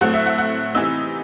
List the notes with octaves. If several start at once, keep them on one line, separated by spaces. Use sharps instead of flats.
A2 F#3 A3 C4 F#5
E5
F#5
F#5
C3 E3 B3 D#4 E6